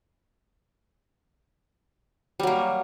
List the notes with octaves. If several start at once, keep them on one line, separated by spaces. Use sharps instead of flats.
F#3 G3 A#3